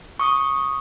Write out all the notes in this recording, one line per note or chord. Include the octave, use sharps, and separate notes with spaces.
C#6 D#6